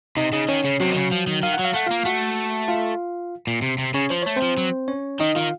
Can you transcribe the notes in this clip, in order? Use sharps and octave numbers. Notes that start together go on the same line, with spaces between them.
C3 D#4 D#5
C#3 D#4 D#5
D#3 C#4 C#5
C#3
C3 F#3 F#4
D#3
C#3
F3
D#3
D#3 F5
F#5
F#3
F5
A3 F#5
A#3 F4 F5
A3 F#4 F#5
F4 F5
A#2
C3
C3
C#3 C#4 C#5
F3 C5
A3 C#5
C4 C5
F3
F#3
C#4 C#5
D#3 D#4 D#5
D#3 F4 F5